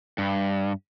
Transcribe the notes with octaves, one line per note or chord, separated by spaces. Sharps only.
G2